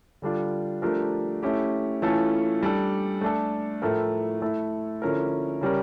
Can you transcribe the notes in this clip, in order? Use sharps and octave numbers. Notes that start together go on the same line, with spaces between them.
D3 G3 D4 F4
F3 A3 D4 G4 A#4
A3 C#4 E4 G4
E3 A3 C#4 F4 A4
G3 D4 A4
A3 D4 A4
A2 F3 A3 E4 A#4
A3 E4 A4
D3 F3 C#4 E4 A#4
C#3 G3 C#4 G4 A#4